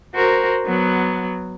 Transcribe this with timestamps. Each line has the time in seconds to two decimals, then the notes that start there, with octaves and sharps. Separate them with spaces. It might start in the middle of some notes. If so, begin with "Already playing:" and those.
0.15 F#4 A#4 C5
0.66 F#3 B3